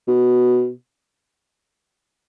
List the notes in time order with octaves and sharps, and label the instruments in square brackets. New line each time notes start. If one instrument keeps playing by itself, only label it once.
[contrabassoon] B2